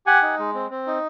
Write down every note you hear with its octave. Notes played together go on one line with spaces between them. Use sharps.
G4 F#5 G#5
D#4
G#3
C4
C4
D#4